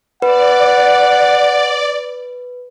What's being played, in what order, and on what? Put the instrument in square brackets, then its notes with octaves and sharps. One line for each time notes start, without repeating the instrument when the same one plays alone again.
[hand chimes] B4 [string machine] D5 [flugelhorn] F#5